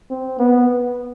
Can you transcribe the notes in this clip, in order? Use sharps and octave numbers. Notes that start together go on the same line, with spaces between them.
C4
B3